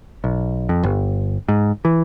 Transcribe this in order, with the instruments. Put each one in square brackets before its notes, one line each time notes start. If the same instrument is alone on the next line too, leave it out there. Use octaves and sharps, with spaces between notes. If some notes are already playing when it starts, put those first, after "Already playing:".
[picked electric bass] B1
F2
G1
G#2
E3